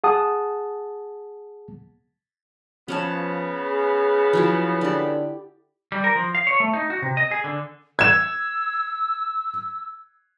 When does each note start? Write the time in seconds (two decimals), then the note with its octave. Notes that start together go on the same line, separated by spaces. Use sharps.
0.04 G#4 F#5 A5 D#6
2.88 C#3 F3 B3 C#4 C#5 A5
3.66 G#4
4.33 F3 F#3 E4
4.81 D3 G4 D5
5.92 G3
6.04 A#4
6.16 F3
6.35 F5
6.47 C#5
6.60 A3
6.73 D#4
6.90 F#4
7.02 C3
7.17 D#5
7.31 G#4
7.44 D3
7.99 E6 G#6 E7